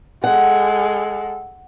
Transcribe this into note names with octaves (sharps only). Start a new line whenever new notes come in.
G#3 A4 F#5